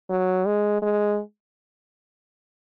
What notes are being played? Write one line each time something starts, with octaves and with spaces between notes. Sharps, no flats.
F#3
G#3
G#3